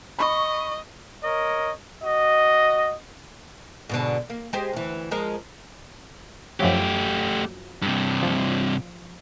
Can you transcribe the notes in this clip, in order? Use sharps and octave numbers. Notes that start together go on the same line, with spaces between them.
D#5 B5 C#6
A#4 C#5 D#5
F#4 D#5
G#2 B2 D3
A#3
G#3 G4 C5
D2 E3
F3 G#3 A#4
F#2 F3 F#3 A3 G4
G2 C3
F3